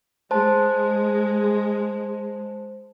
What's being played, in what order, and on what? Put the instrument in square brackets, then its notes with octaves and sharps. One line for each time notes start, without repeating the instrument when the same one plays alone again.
[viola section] G#3 [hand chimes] C5 A5